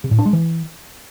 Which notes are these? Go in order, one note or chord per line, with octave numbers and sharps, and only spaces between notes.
C3
A2
D4
G#3
E3